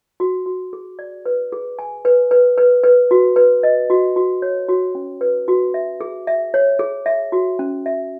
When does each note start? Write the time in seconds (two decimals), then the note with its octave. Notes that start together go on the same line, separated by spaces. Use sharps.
0.20 F#4
0.46 F#4
0.73 G#4
0.99 D5
1.26 B4
1.52 G#4
1.79 G#5
2.05 B4
2.31 B4
2.58 B4
2.84 B4
3.11 F#4
3.36 B4
3.63 D#5
3.90 F#4
4.16 F#4
4.42 C#5
4.69 F#4
4.95 C#4
5.21 B4
5.48 F#4
5.74 E5
6.01 G#4
6.27 E5
6.54 C#5
6.79 G#4
7.06 E5
7.32 F#4
7.59 C#4
7.86 E5